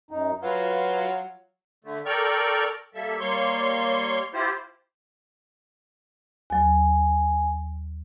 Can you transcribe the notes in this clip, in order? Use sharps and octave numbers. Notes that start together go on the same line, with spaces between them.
F#2 D#4
F#3 F4 B4
D3 A3
A4 A#4 D5 G5 C#6 F6
G3 A#3 A4 E5
G3 A#3 C#5 C6 C#6
E4 F4 G4 C5
D#2 F#3 G#5